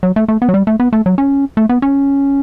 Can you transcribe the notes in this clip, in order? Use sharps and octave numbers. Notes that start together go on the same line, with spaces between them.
F#3
A3
A3
B3
F#3
G3
A3
B3
A3
F#3
C#4
A3
B3
C#4